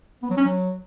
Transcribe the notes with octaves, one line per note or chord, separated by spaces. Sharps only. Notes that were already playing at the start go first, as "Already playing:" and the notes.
B3
F#3
C#4
F#3